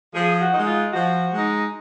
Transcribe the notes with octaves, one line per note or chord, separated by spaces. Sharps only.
F3 G#4
F#4
G#3 D#4
F4
F3 F#4
G#3 D#4